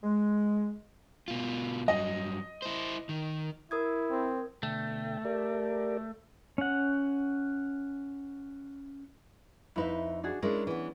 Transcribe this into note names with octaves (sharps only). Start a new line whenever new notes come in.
G#3
B2 F4
G2 F#3 D#5
E4 C5
D#3
E4 A#4 D#6 G#6
C4
B2 D3 A3 G5
G4 A#4 D5
C#4 F#5
F2 D#4 E4 B4 E5
D4 F#4 G#4
G#3 C#4 D4 E4 A#4
E3 B3